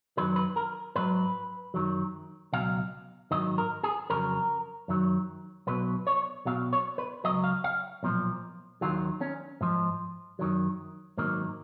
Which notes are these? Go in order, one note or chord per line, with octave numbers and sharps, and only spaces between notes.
F#2 D#3 F#3 B4
B4
A#4
G#2 F#3 B4
F#2 D#3 F#3
C#2 B2 F#3 F5
G#2 D#3 F#3 D#5
A#4
G#4
F2 C#3 F#3 A#4
F#2 D#3 F#3
B1 B2 F#3 B4
C#5
B1 B2 F#3 F5
C#5
B4
C#2 B2 F#3 D#5
F5
F5
B1 A#2 F3
D#2 D#3 F#3 F4
C#4
G#2 F3
F#2 D#3 F#3
G#2 D#3 F#3 A#3